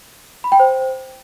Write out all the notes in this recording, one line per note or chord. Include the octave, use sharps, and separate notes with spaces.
B5
G5
C5